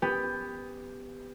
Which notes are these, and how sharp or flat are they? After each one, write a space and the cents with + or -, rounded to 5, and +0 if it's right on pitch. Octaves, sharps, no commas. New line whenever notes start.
B3 +15 G4 +15